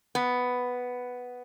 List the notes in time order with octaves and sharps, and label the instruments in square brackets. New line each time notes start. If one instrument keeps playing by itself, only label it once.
[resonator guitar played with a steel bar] B3